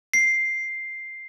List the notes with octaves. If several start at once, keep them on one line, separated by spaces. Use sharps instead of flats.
C7